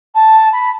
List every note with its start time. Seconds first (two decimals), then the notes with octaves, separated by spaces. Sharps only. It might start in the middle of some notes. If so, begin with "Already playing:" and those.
0.15 A5
0.53 B5